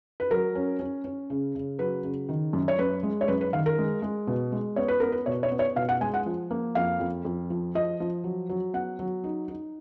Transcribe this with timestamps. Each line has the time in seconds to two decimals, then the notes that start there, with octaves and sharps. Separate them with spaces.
0.20 B4
0.30 F#3 A#4
0.55 C#4
0.79 C#4
1.04 C#4
1.30 C#3
1.55 C#3
1.79 F#3 B4
2.04 C#3
2.29 D#3
2.53 F#2
2.68 C#5
2.79 F#2 B4
3.03 G#3
3.21 C#5
3.28 F#2 B4
3.41 B4
3.53 D#3 F5
3.66 A#4
3.78 G#3
4.02 G#3
4.27 B2
4.52 G#3
4.76 B3 C#5
4.88 B4
5.00 B3 A#4
5.12 B4
5.26 B2 C#5
5.43 C#5
5.51 B3
5.59 C#5
5.76 B2 F5
5.89 F#5
6.01 G#3 G#5
6.14 F#5
6.26 F3
6.51 A#3
6.75 F2 F5
7.00 F2
7.25 F2
7.50 F3
7.75 F3 D#5
8.00 F3
8.24 F#3
8.49 F#3
8.73 B3 F#5
8.99 F#3
9.24 D#4
9.48 D#4